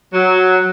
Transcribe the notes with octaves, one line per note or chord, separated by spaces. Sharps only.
F#3